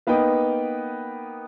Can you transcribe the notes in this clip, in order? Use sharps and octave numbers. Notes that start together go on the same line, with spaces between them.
A#3 B3 D#4 B4 G5